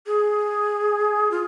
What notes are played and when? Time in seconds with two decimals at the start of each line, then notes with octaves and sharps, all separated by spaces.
0.07 G#4
1.31 F4